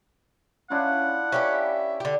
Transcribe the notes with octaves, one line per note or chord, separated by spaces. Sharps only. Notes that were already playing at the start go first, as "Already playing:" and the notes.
C#4 D4 E4 F4 F#5
C#4 G4 B4 D5 E5
D3 G4